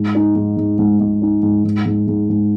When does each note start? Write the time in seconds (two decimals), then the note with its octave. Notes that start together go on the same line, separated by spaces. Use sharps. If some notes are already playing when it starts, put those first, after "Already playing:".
Already playing: G#2
0.15 D#4
0.35 G#2
0.57 G#2
0.78 G#2
1.00 G#2
1.22 D#4
1.43 G#2
1.65 G#2
1.86 G#2
2.07 G#2
2.29 G#2